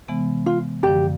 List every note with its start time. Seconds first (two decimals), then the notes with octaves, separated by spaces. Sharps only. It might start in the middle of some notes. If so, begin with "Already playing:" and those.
0.08 C3 E3 G#3 B3
0.46 F4
0.83 F#2 D3 F3 G4